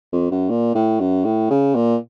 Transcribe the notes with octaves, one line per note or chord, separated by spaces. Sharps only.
F2
F#2
A#2
A2
F#2
A2
C#3
A#2